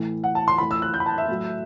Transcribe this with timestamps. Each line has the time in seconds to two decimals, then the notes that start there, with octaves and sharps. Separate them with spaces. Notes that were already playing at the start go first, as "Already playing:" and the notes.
Already playing: A2 E3
0.24 F#5
0.35 A5
0.48 C6
0.58 A2 E3 B5
0.71 E6
0.82 F#6
0.94 G6
1.00 B5
1.06 A5
1.18 E5
1.28 A2 F#3